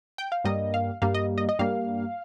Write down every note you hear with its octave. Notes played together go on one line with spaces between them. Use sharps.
G5
F5
G2 G3 A#3 D#5
F5
G2 G3 A#3 F5
D#5
D#5
D#5
G2 G3 A#3 F5